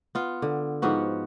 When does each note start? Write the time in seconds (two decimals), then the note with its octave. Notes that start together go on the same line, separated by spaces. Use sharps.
0.15 B3 F4
0.42 D3
0.82 G#2 F3 B3 F#4